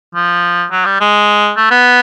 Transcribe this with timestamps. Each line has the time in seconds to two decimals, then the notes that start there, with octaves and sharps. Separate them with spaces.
0.15 F3
0.71 F#3
0.85 G3
1.00 G#3
1.57 A3
1.71 B3